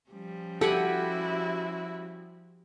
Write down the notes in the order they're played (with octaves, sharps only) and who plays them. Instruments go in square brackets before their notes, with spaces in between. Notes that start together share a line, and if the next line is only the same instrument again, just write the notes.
[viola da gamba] F3 G3 C#4
[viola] E4 F#4 [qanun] G4 F#5 G#5 [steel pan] A4